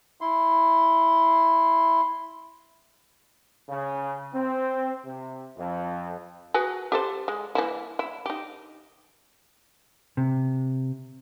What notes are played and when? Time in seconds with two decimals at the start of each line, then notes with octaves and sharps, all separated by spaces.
0.21 E4 C6
3.68 C#3
4.34 C4
5.05 C3
5.57 F2
6.54 F#4 G#4 B4
6.92 G4 A4 C5
7.28 G#3
7.55 E3 A#3 E4
7.99 E4
8.26 D#4 G4
10.17 C3